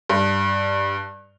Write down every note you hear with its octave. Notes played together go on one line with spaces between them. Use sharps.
G2